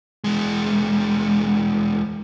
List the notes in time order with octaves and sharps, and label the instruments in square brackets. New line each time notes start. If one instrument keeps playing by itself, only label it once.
[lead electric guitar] E2 G#3